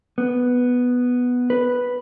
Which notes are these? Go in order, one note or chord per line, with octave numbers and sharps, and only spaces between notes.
B3
B4